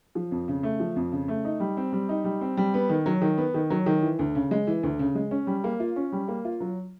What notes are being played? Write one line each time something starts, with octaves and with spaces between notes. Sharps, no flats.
F3
F2
C#3
A3
F3
F2
C#3
A3
D#4
G3
C4
G3
D#4
G3
C4
G3
B3
D#3
F#3
D#3
B3
D#3
F#3
D#3
E3
D2
C#3
G#3
E3
D2
C#3
G#3
C#4
G3
A#3
F4
C#4
G3
A#3
F4
F#3